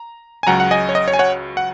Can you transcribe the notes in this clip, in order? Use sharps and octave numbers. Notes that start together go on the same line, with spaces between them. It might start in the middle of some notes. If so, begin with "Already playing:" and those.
Already playing: A#5
G#5
C#2 C#3 F#3 F#5 A#5
F#5
D#5 G#5
C#5
D#5
C#5
G#5
C#5 F#5
F#5